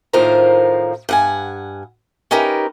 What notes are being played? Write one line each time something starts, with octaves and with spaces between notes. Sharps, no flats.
A2 D#3 F3 A#3 C5 A#5
G2 F#5 G#5
C#4 D#4 G4 A#4 B4